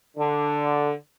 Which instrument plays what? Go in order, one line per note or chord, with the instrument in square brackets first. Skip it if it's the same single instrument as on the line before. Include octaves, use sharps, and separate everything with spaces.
[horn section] D3